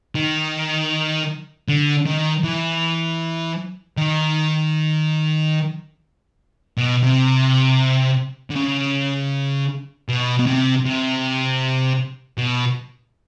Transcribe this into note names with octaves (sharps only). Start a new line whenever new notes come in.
D#3
D3
D#3
E3
D#3
B2
C3
D3
C#3
B2
B2
C3
C3
B2